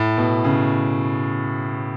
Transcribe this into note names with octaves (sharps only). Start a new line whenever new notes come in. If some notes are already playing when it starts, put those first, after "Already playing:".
Already playing: A2
B2
C#3